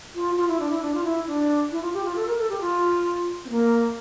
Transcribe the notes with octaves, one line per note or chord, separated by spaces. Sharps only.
F4
F4
E4
D4
E4
D4
F4
E4
D4
E4
F4
G4
F4
A4
A#4
A4
G4
F4
C4
A#3